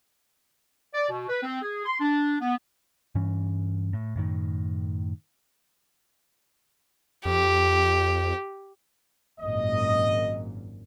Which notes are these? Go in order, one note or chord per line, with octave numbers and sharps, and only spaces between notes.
D5
B2
B4
C4
G#4
C6
D4
B3
G2 E3 C#4
A2
F#2 A2 D#3
F2 G4
G#1 F#2 A#2 D#5